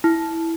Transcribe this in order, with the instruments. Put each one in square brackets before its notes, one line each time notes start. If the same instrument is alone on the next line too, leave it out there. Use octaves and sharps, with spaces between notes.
[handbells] E4